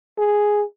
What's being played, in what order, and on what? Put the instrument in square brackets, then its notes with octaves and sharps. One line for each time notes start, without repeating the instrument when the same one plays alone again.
[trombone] G#4